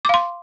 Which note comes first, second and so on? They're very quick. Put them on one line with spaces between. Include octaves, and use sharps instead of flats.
D6 F5 C6